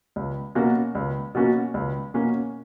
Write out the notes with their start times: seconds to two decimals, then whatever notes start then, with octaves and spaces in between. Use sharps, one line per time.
0.16 C#2
0.55 B2 A#3 C#4 F#4
0.95 C#2
1.35 B2 A#3 C#4 F#4
1.74 C#2
2.14 B2 A#3 C#4 F#4